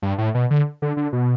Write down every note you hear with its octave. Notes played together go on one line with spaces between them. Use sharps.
G2
A2
B2
D3
D3
D3
B2